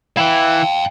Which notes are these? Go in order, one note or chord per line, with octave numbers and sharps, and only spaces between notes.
E3 E4 F5 G5